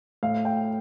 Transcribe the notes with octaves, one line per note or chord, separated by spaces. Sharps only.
A2 F5
G5